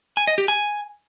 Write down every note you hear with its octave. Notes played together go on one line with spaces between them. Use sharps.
G#5
D#5
G4
G#5